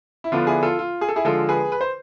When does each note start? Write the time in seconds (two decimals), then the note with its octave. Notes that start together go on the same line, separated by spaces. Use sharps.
0.24 E4
0.32 D3 F3 B3 D4 F4
0.47 E4 G#4
0.63 F4 A4
0.79 F4
1.01 G#4
1.09 A4
1.16 E4 G#4
1.25 D3 F3 G#3 F4 A4
1.49 G#4 B4
1.72 B4
1.81 C5